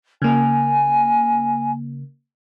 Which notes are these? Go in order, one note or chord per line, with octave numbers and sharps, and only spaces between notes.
C#3 A#3 G#5